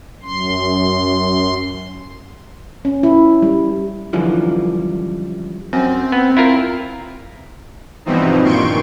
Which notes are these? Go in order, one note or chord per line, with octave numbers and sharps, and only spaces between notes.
F#2 C6
C#4
E4
G3
F#2 D3 E3 F3 G3
F#2 C4
B3
E4 F4 A#4
G2 B2 E3 F3 C4 D#4
G2 A#2 D#3 C6 C#6 D7